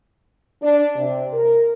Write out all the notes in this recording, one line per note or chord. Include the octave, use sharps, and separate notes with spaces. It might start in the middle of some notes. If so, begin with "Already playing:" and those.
D4
C3
A#4